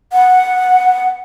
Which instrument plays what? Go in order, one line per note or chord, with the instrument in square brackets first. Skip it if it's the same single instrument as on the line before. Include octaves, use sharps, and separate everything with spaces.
[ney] F#5